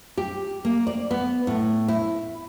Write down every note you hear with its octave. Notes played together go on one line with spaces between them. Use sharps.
G4
A#3
D5
B3
A2
E4